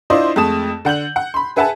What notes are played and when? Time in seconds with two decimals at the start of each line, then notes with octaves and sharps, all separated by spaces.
0.10 D4 E4 F4 C5 D5 D#5
0.36 F2 G#3 A3 A5 D#6 E7
0.85 D3 F#5 G6 F#7
1.16 F#5
1.34 B5 C6
1.56 G#4 B4 E5 F#5 G#5 A5